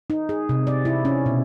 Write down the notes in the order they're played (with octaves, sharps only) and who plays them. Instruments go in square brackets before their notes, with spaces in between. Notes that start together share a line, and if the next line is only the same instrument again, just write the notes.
[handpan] D#4
G#4
C3
D5
E4
C#4
B2